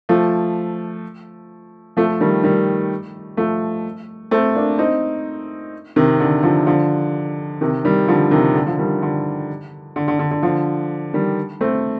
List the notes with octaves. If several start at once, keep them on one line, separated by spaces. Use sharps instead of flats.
F3 A3
F3 A3
D#3 G3
D#3 G3
F3 A3
A3 C4
A#3 D4
C4 D#4
C3 D#3
D3
D3 F3
D3 F3
C3 D#3
D#3 G3
D3 F3
C3 D#3
D3
D3 F3
D#3 G3
D3
D3
D3
D3
D3
D3 F3
D#3 G3
A3 C4